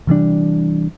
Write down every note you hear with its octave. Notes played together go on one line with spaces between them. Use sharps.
C3 E3 G3 D4